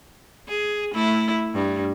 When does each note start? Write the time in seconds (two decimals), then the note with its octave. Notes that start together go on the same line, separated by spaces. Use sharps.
0.48 G#4
0.93 A3 E4
1.54 G2